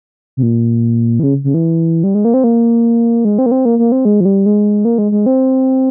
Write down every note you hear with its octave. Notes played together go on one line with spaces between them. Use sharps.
C3
A#2
E3
C#3
C#3
E3
G3
G#3
A#3
C4
A#3
G#3
C4
A#3
C4
A#3
A#3
C4
G#3
F3
G3
G#3
A#3
G#3
G#3
C4